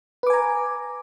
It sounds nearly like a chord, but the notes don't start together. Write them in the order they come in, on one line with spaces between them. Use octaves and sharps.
B4 D6 G#5 A#5